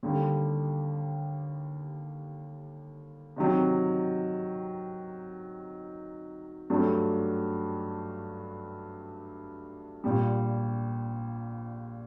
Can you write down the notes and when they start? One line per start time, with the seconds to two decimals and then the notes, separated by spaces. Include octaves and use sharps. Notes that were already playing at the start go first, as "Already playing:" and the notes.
0.03 D#2 D3 G3
3.36 C3 D#3 F#3
6.70 G2 F#3 A3 D4
10.04 A#1 A#2 G3